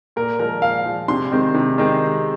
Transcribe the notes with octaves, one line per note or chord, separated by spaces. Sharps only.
A#2 A#4
F3 G#3 A#4
A#2 F5
F3 G#3
C3 C6
D#3 G#3 C4
C3
D#3 G#3 C4